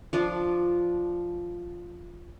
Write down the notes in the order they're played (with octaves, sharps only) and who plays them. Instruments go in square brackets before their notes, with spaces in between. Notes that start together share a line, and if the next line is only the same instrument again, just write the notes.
[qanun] F3 D4 F4